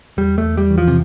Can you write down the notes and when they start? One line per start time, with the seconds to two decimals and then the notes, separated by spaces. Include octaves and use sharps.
0.17 E2 G3
0.38 A3
0.44 E2
0.57 G3
0.71 E3
0.78 F3
0.88 C3